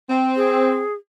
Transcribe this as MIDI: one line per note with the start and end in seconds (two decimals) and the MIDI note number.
0.10 0.81 60
0.36 0.94 68